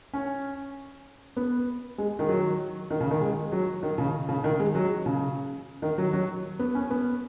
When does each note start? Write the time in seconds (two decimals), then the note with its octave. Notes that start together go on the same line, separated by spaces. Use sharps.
0.14 C#4
1.37 B3
1.98 G#3
2.19 D#3
2.29 F#3
2.90 D#3
3.00 C#3
3.11 D#3
3.21 G#3
3.52 F#3
3.83 D#3
3.98 C#3
4.29 C#3
4.44 D#3
4.60 G#3
4.75 F#3
5.06 C#3
5.82 D#3
5.98 F#3
6.13 F#3
6.59 B3
6.75 C#4
6.91 B3